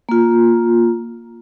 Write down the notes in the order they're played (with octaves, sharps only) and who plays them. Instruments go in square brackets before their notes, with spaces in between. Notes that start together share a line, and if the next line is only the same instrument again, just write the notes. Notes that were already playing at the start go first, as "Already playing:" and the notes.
[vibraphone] A#3 F4